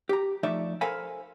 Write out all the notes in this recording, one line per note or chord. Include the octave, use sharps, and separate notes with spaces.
G4 A#5
F3 A3 D#4 D5 E5
A4 A#4 C5 F5 G#5 B5